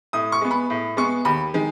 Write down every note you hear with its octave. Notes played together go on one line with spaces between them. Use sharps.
A2 D#6
C#6
G#3 B3
B5
A2
G#3 B3 C#6
D#2 B5
D#3 G#3